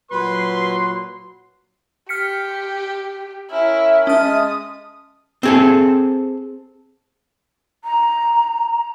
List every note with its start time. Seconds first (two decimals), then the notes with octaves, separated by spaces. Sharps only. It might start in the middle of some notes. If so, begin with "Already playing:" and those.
0.11 A#2 F#3 B4 C6
2.09 G4 F6 B6 C#7
3.50 C#4 E4 A#4 E5
4.07 G#3 C#4 A5 D#6 F6
5.43 C4 G#4 A4
7.84 A#5